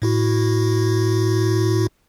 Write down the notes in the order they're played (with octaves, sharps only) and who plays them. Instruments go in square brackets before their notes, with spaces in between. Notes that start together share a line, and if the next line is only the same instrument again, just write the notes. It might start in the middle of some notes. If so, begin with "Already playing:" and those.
[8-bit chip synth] A2 E4 F#4